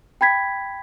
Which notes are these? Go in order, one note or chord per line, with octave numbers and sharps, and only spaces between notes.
G5 B5 G#6 B6